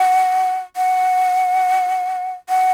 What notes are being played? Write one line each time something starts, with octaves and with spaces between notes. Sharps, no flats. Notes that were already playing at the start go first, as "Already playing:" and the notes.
Already playing: F#5
F#5
F#5